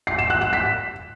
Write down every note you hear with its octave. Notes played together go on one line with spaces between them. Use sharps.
C7
E7
F#6
E7
B6